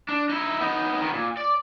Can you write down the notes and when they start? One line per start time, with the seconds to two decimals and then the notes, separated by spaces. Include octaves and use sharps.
0.09 D4
0.29 D#4 E4
0.60 B3 D#4
1.01 D#3 B3
1.14 A#2
1.37 D5